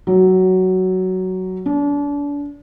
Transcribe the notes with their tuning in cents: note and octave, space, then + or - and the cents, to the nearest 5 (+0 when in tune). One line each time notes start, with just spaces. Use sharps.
F#3 +10
D4 -35